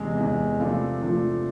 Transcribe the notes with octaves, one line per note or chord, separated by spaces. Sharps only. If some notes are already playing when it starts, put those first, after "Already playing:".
Already playing: E2 C3 G#3
E2 C3 G#3
C3 F3 A3 D4 F4
C3 F3 A3 D4 F4